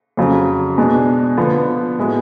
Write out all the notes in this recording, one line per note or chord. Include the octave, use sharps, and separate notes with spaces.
F2 C#3 F#3
B2 G#3 D4
D3 F3 B3
A2 G#3 B3 F#4